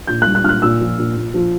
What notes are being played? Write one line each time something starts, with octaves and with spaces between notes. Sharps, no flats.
A#2 G6
F#6
G3
F#6
A#2 F6
F#6
A#2 E6
F3
A#2
A#2
F3